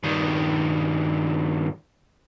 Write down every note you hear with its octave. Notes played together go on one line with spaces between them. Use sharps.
G2 D#3